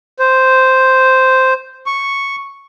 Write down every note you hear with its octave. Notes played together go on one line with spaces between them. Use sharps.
C5
C#6